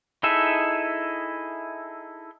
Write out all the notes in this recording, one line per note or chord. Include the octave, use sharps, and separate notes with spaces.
D#4 E4 G#4 A4 E5